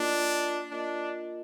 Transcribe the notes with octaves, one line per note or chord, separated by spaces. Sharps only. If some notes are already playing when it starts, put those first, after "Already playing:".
Already playing: A#3 D4 F4 A#4 D#5
A#3 D4 F4 A#4 D#5